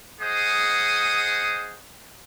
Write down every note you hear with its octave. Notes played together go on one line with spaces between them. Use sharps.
G#4 C5 D#5 F#5 D#6